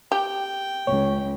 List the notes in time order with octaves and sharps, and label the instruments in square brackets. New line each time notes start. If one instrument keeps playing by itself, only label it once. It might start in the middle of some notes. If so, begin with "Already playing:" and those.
[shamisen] G4 [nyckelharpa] G5
[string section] C#2 [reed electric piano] C#5